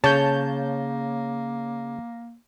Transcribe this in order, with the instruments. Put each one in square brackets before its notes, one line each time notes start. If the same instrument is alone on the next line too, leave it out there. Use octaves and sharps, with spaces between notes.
[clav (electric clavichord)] C#3 [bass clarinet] A#3 [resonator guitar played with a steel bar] C#5 [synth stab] A5 G6